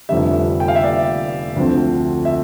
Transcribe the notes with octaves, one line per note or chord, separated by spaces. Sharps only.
F1 F2 D3 G3 E5
G5
F5
E5
D5
D2 D3 F3 C4
E5